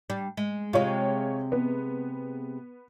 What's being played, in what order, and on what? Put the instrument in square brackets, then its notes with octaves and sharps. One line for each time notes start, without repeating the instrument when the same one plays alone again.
[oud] G3 D4
G#3
[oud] C3 G#3 [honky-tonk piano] F4 C#5
[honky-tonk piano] B3